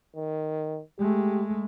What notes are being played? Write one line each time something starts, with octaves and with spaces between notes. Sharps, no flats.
D#3
G#3 A3 G4